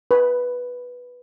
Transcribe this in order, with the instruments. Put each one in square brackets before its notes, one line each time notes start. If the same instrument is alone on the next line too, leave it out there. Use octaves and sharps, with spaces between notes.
[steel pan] B4